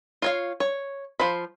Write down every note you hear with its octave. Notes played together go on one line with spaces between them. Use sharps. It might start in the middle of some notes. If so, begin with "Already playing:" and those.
F4 C#5 F5
C#5
F3 C5 B5